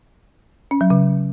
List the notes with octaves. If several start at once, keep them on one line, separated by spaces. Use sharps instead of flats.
C#4
F#3
C#3